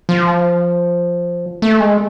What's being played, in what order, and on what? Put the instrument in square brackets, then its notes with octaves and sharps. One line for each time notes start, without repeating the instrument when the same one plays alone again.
[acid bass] F3
A3
G#3